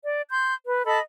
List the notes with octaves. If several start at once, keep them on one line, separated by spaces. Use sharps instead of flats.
D5
C6 G6
B4
A4 D#5 A5 B5